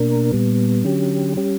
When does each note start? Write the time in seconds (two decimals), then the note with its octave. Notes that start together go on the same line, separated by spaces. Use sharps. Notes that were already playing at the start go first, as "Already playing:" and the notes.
Already playing: B2 A#3 D4 A#4
0.32 A#2 G3 B3
0.84 D3 F#3 C#4 G4
1.37 G3 C#4 G4